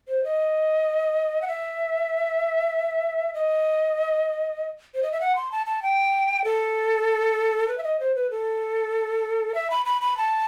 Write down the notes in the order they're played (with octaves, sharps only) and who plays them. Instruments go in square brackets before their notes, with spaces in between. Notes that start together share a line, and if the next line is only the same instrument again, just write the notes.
[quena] C5
D#5
F#5
E5
D#5
C5
D#5
E5
F#5
C6
A5
A5
G5
A4
B4
E5
D#5
C5
B4
A4
E5
B5
B5
B5
A5